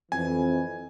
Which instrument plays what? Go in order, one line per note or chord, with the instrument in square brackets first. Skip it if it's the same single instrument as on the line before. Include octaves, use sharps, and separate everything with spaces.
[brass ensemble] F2 E3 [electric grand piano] G#5